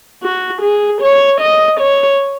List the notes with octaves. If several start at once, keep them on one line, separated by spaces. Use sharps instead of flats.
F#4
G#4
C#5
D#5
C#5